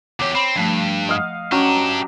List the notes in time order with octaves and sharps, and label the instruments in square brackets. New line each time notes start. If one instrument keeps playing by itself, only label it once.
[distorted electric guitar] E2 G4 [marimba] C#5 D6
[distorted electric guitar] C4 [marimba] B5
[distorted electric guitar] G2 [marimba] F3 A3
[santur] D#5 F5 F#5
[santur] F#3 [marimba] C#4 [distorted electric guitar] D4 G4